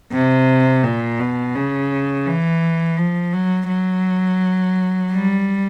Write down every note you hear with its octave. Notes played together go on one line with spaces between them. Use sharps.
C3
A#2
B2
C#3
E3
F3
F#3
F#3
G3